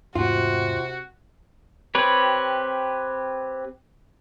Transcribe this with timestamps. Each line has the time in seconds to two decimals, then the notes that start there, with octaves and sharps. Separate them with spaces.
0.15 E2 G#2 C3 A3 F4 F#4
1.95 C4 G4 B4 C#5